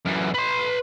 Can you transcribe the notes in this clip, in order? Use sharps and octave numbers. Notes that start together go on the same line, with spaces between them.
F#2 E3
B4 C6